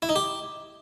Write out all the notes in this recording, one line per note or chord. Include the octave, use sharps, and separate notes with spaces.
E4
D#4
G4